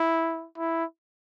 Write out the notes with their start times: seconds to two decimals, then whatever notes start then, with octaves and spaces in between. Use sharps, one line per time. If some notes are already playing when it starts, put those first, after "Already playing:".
Already playing: E4
0.58 E4